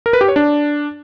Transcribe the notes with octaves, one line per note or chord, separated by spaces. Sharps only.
A#4
B4
G4
C#5
D4